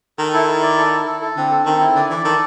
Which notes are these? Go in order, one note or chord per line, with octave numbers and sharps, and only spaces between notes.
D#3 A4
E4
E4
D5
A4
E4
A4
A4
D3 C4
A4
D#3 C4
E4
D3 D5
E3 D5
D#3 A4